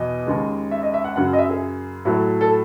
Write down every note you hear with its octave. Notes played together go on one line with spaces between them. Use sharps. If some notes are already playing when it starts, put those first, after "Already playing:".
Already playing: E2 B2 D#5
D#2 C#3 G#3
E5
D#5
E5
F#5
F#2 C#3 F#3 F#5
D#5
E5
G#4
A2 F#3 A3
A4